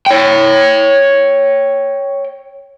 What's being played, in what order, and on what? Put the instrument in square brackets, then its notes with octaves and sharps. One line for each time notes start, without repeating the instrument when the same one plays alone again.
[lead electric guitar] C#5 G5